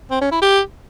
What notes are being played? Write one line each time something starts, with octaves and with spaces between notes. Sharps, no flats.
C4
C#4
E4
G4